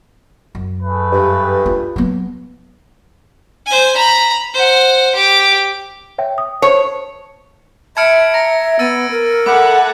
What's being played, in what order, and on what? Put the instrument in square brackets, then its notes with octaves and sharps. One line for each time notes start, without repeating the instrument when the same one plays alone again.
[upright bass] F#2
[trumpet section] A3 G#4 B4
[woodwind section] G2
[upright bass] F4
F#3 B3
[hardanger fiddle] C5 G#5
A#5 B5
C5 F#5
G4 D6
[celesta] C#5 E5 G5
D#6
[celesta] C5 A5 [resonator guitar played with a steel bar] C#5
[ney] E5 [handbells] A5 B5 F6 [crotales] G#6 C#7 D7
[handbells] A#5 [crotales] A#6
[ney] B3 [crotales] E6 A6 D#7
[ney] A#4
[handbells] A3 B5 [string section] A4 F#5 [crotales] D6 F#6